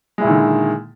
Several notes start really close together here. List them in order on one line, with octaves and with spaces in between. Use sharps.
G#3 E4 A#2 D#3 D3